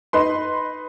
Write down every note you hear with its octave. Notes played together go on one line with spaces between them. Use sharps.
D#4 B4 C6